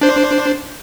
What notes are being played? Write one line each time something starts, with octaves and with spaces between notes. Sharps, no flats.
D4 C5